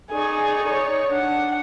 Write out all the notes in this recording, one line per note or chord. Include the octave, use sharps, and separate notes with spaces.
D#4 G#4 D5 G#5 C#6
C#5
D4 F#5